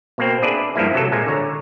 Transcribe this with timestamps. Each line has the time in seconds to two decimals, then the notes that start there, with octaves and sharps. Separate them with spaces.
0.18 B2 A#3 C4
0.42 D4 G#4 B4 D5 E5
0.75 G2 F3 G3 A#3 E4
0.94 C3 F#3 A4
1.12 A#2 G#3 A#3 G#5
1.26 D3 C#5 A#5